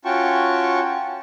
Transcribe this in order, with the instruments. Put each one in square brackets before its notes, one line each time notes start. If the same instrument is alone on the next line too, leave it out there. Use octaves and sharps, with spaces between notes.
[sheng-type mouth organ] C#4 F4 F#4 G5 A5 C#6